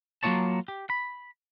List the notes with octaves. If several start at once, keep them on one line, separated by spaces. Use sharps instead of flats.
F#3 A#3 D#4 F4 C#5 A5
G4
B5